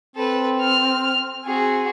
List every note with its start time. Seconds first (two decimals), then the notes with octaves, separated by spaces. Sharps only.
0.16 C4 A4 B4
0.60 F6
1.45 C4 F#4 G#4